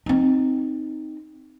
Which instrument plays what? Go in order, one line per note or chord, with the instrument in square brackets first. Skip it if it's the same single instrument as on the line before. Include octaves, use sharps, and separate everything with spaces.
[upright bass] C4 D#4